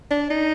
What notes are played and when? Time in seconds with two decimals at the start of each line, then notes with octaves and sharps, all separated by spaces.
0.11 D4
0.30 D#4